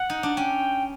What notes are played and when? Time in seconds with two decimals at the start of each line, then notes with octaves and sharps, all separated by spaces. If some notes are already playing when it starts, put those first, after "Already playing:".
Already playing: F#5
0.10 D#4
0.23 D4
0.37 C#4 G5